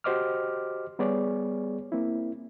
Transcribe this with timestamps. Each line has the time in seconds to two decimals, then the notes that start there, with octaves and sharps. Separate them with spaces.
0.04 F#4 G4 C5 D#5 D6 F6
0.99 G3 B3 G#4 C#5 D5
1.92 A#3 C4 E4